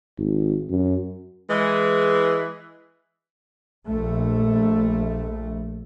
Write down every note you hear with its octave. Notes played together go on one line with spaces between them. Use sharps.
G#1
F#2
E3 G#3
A#1 A3